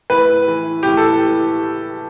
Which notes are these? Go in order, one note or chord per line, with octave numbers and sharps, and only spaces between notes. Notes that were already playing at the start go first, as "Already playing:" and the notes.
A2 B4
E3
A2 G4
A4